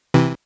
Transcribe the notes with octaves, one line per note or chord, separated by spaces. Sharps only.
C3 E3